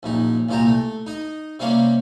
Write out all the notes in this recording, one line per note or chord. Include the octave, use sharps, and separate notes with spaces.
A#1 F#2 D#4
C2 A#2 F4 G4 A#5
A3
D#4 D#5
C3 G3 A#3 C#4 F5